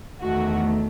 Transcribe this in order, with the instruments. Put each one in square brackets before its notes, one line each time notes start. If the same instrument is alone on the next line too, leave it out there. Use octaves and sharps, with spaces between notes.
[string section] E2 D#3 A3 F#4